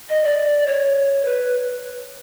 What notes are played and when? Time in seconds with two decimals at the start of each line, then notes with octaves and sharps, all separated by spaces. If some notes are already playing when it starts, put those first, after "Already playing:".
0.09 D#5
0.24 D5
0.66 C#5
1.25 B4